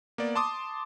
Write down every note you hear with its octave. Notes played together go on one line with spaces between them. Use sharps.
A#3 B3 D5
A5 C6 D6 D#6